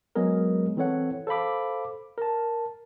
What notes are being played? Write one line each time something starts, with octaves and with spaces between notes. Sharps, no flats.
F#3 G#3 B3 G#4 A#4
E3 C4 A4 C#5 F#5
A4 C5 F5 B5 D6
A#4 A5